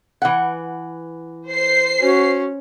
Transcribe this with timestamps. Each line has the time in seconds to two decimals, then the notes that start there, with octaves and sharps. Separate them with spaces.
0.22 E3 F#5
1.48 C5 C7
2.00 C#4 F#4